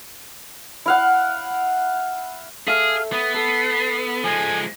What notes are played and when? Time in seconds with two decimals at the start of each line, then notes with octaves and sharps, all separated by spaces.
0.86 E4 F5 F#5
2.68 G#4 A4 E5 F5
3.12 B3 D#6
3.35 A4 C7
4.24 F3 G#3 G#5